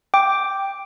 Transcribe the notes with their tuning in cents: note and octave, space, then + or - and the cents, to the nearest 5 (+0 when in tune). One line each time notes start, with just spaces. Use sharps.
G5 +0 D6 +0